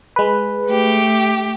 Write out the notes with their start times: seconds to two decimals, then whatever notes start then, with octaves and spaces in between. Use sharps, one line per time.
0.16 G#3 B4
0.67 A3 G4